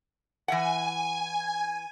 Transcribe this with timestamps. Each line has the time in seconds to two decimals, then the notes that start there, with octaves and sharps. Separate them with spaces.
0.48 E3 E5 F#5 G#5